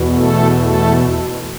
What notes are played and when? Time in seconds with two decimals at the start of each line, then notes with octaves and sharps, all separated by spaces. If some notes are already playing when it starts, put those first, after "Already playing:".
Already playing: E2 B2
0.16 A3 A4
0.61 A3 A4